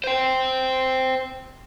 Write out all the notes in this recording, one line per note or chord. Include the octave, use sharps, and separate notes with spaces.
C5 G5